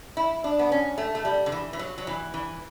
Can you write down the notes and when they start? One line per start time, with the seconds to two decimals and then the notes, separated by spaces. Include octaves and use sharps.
0.17 E4
0.44 D4
0.59 B3
0.72 C#4
0.98 A3
1.15 A3
1.25 G3
1.46 D3
1.52 E3
1.73 E3
1.79 F#3
1.98 F#3
2.07 E3
2.34 E3